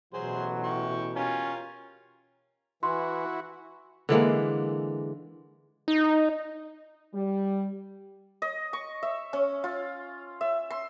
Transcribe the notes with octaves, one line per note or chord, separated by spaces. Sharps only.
A1 B2 E3 F#3 G#4 C5
G5 C#6
C#4 F4 G4 A#4
E3 E4 F#4 C6
D3 E3 G#3 A#3
D#4
G3
D#5
C#6
E5
C#4
F4
E5
C6